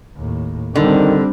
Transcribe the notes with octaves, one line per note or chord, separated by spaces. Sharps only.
D#2 A2
D3 D#3 G3 C4